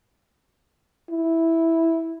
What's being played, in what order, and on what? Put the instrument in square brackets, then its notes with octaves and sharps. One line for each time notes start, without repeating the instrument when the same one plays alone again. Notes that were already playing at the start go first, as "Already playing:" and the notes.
[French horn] E4